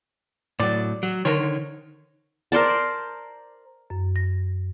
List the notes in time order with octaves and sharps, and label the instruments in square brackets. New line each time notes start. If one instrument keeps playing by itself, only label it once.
[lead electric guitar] A2 F#3 [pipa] D5
[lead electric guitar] F#3
[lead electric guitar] D3 D#3 [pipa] A#4 C5 C#5
[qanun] A#4 C5 D5 A5
[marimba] F#2
A#6